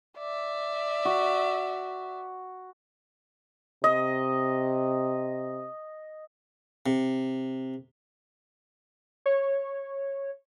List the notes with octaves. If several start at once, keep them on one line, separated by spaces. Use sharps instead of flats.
D5 E5
F#4
C3 D#5
C3
C#5